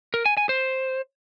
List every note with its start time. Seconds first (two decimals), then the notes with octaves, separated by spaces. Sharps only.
0.14 A#4
0.26 G#5
0.37 G#5
0.49 C5